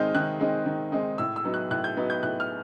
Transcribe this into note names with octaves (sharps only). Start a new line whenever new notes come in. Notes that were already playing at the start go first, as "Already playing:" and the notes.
Already playing: D#3 G#3 C4 D#4 F6 G6
D#3 F#6
G#3 C4 D#4
D#3
G#3 C4 D#4
A2 E6
E6
F#3 B3 D#4
F#6
A2 F#6
G6
F#3 B3 D#4
G6
A2 F#6
F6